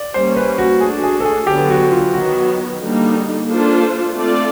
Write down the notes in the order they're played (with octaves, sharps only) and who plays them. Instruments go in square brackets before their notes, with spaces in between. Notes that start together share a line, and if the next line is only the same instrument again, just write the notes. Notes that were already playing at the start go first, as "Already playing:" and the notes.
Already playing: [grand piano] D5
[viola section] G3 A#3 C#4 [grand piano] C5
[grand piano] B4
F#4
[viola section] A3 D4 F#4 [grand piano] G#4
[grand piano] G#4
A4
G#4
[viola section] D3 F#3 B3 [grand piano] G4
[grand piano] F#4
F4
[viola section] D#3 F#3 B3 [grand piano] F#4
[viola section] D3 G3 A#3 D#4
A#3 D4 F4 A4 C5
A3 C4 F4 A4 D5